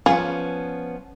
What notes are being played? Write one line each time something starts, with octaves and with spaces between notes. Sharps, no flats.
F3 B3 C#4 F4 G#4